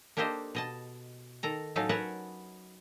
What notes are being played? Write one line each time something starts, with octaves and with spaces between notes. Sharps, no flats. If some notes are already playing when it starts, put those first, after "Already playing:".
A#3 D4 G4 A4 C5 D#5
B2 D#5 A5
D#3 A4 A#5
A2 F#3 C#4 D#4 A4 F5
A#4 B4 C#5 F#5 A5